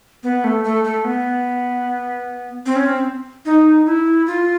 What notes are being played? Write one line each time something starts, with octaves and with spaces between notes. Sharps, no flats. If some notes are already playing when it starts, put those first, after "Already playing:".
B3
A3
A3
A3
B3
C4
C#4
C4
D#4
E4
F4